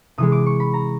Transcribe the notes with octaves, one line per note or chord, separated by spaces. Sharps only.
C3 E3 G#3 D#6
D6
C#6
B5
A#5